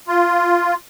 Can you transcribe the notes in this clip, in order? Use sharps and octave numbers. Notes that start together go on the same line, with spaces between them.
F4